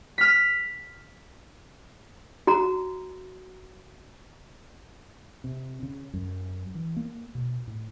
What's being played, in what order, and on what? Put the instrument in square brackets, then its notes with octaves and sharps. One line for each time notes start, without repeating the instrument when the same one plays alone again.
[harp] F6 B6
[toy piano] F#4 A#5
[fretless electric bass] C3
C#3
F#2
E3
A#3
B2
A2